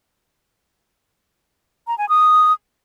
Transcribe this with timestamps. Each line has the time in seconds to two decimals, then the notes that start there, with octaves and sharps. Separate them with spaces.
1.87 A#5
1.98 G#5
2.09 D#6